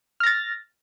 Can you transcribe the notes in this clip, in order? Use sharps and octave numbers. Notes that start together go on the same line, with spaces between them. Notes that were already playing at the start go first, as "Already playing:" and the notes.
F6 A6 A#6